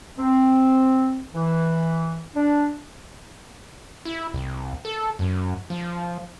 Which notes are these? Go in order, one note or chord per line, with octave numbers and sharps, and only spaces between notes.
C4
E3
D4
E4
C2
A4
F#2
F3